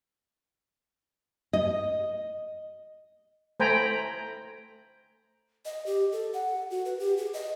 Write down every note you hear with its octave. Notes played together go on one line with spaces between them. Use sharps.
D#5
A3 C5 G5 G#5 A#5 B5
D#5
G4
A4
F#5
F#4
B4
G4
G#4
D#5